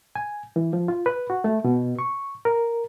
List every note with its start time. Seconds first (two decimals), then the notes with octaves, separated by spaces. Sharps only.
0.15 G#5
0.56 E3
0.73 F3
0.88 F4
1.06 B4
1.30 F#4
1.44 A3
1.65 B2
1.99 C#6
2.45 A#4